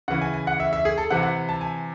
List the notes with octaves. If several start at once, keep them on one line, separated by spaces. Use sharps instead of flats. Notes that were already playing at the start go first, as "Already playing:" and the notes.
C#3 E3 F#5
G#5
G#5
F#5
E5
E5
G#4
A4
C3 E3 F#5
F#5
A5
G#5